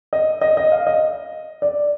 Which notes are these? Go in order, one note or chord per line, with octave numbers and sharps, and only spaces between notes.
D#5
D#5
D#5
F5
D#5
D5